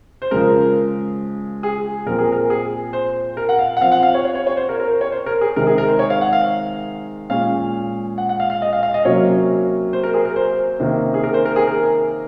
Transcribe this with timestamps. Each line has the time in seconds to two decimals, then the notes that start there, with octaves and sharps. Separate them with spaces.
0.22 C5
0.31 C#3 F3 G#3 A#4
1.63 G#4
2.06 A#2 F3 C4 A#4
2.19 G#4
2.32 A#4
2.50 G#4
2.93 C5
3.37 A#4
3.49 F#5
3.59 F5
3.77 F#5
3.81 F3 C4 F5
3.92 F#5
4.03 F5
4.14 C#5
4.25 C#5
4.35 C#5
4.47 C#5
4.57 C5
4.69 A#4
4.80 A#4
4.90 C5
5.01 C#5
5.12 C5
5.26 A#4
5.41 G#4
5.56 C3 D#3 G#3 A#4
5.67 G#4
5.78 A#4
5.88 C5
5.99 C#5
6.10 F5
6.21 F#5
6.33 F5
7.30 A#2 G#3 C#4 F5
8.18 F#5
8.29 F#5
8.40 F5
8.50 F5
8.62 D#5
8.73 F5
8.83 F5
8.94 D#5
9.05 C3 F#3 A#3 C#4 C#5
9.93 C5
10.03 A#4
10.14 G#4
10.25 A#4
10.36 C5
10.80 C3 D#3 A#3 C#4
11.14 G#4
11.23 A#4
11.34 C5
11.45 A#4
11.56 G#4
11.67 A#4